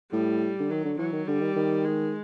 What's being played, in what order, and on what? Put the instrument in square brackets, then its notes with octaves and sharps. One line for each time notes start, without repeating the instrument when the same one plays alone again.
[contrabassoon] A2 [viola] G3
[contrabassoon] D3
[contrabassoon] D#3 [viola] F#3
[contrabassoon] D3
[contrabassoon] E3 [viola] F#3
[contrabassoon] D#3
[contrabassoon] D3 [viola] G3
[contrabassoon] D#3
D#3
[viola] G#3